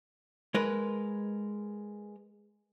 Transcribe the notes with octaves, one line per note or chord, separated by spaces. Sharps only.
G#3 A#4 B4